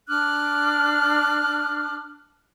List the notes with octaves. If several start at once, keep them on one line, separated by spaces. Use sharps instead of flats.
D4 D6 F6 F#6